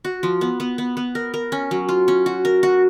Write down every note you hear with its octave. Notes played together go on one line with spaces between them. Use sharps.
F#4
F3
B3
B3
B3
B3
A#4
A#4
C#4
F#3
F4
C#4
F#4
A#4
F#4